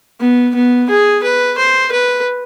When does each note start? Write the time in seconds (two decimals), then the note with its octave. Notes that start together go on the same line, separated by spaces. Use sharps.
0.21 B3
0.55 B3
0.90 G#4
1.24 B4
1.58 C5
1.92 B4